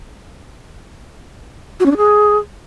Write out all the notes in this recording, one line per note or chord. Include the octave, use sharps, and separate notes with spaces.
F#4
C#4
D4
G#4